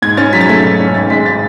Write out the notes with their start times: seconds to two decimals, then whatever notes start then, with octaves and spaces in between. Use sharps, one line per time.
0.02 G#2 G#6
0.17 C#4 A6
0.33 F#3 B6
0.41 A6
0.49 A3 B6
0.64 G#2
0.80 C#4
0.95 G#1 A6
1.10 G#3 B6
1.26 A6